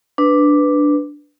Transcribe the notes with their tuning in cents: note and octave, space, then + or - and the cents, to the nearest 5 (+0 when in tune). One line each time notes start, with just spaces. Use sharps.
D4 +0 B4 +0